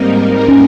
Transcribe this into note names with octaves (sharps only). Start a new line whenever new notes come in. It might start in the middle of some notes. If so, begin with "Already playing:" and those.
Already playing: G#2 G3 A#3 C4 D#4 A#4
C#4